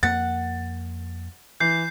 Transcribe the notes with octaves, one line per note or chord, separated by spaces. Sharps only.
F2 A#3 F#5 A6
E3 G6 C7